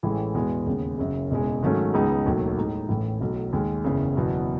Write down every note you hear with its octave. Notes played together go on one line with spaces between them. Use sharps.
A1 A2 E3 G#3
E2 B2 G#3 B3
D#2 C#3 G#3 B3
F#1 F#2 C#3
E1 E2 C#3 G#3
G#2 D#3 F#3 A3 C#4
C#2 C#3 G#3 B3 D#4
E1 D#2 D#3 F#3 A3
A2 G#3 D#4
A1 A2 E3
B1 A2 F#3
D#2 D#3 G#3
F#1 E2 C#3
F#1 E2 B2 F#3